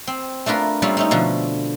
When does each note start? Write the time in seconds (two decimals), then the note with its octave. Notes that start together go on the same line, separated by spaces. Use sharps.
0.07 C4
0.46 A3 D4 F4 A#4 B4
0.82 G3 A3 A#3 C4 C#4 F4
0.97 A3 C#4 D#4
1.11 B2 D3 F3